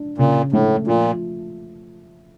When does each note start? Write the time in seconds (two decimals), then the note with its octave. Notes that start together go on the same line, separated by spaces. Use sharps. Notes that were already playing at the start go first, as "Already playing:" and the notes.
Already playing: D4
0.18 A#2 C#3
0.52 A2 A3
0.87 A#2 F3